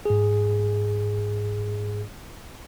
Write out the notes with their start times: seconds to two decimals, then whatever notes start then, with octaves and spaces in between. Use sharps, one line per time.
0.05 G#2 G#4